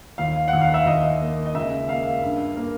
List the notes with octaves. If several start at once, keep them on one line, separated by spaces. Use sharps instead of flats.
D#2 F5
F#5
D#2
F5
E5
D#2 D#5
A#3
D#5
C#2 E5
A#3 F5
G2
A#3